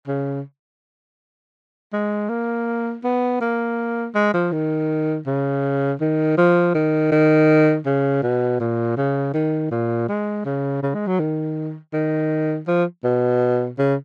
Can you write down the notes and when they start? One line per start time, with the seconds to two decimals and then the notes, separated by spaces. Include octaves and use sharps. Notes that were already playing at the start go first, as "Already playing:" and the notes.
0.08 C#3
1.93 G#3
2.29 A#3
3.04 B3
3.41 A#3
4.15 G#3
4.34 F3
4.52 D#3
5.27 C#3
6.01 D#3
6.37 F3
6.75 D#3
7.12 D#3
7.86 C#3
8.23 B2
8.60 A#2
8.97 C#3
9.34 D#3
9.71 A#2
10.08 G#3
10.45 C#3
10.82 C#3
10.94 G#3
11.07 F#3
11.20 D#3
11.93 D#3
12.68 F3
13.04 B2
13.79 C#3